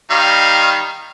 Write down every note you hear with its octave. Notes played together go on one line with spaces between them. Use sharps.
D#3 G3 F5